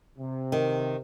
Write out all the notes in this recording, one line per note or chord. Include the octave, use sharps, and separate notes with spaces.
C3
D#3